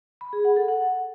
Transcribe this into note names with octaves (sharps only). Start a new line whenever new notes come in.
B5
G#4
F#5
A4
F#5